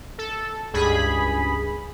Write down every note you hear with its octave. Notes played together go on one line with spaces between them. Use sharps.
A4
C#2 G2 G#4 B5